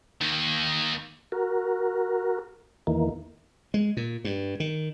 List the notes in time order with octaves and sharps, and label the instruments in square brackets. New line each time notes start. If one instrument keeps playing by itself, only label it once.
[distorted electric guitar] D#2 D#3
[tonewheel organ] F#4 A#4
E2 D#3 E3 A#3
[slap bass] G#3
A#2
G2
D#3